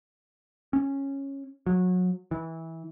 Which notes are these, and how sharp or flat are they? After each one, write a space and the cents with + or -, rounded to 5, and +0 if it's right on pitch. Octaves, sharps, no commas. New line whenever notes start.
C#4 -10
F#3 -25
E3 -20